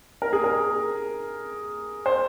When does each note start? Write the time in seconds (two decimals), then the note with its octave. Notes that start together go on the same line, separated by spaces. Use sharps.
0.22 A#4
0.33 G#4
0.44 A#4
2.06 C5